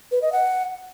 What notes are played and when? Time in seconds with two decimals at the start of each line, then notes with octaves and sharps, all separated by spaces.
0.12 B4
0.22 D#5
0.32 F#5